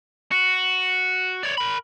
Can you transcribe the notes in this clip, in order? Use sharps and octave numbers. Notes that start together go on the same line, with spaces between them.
F#4
C#5 D5
A#4 B5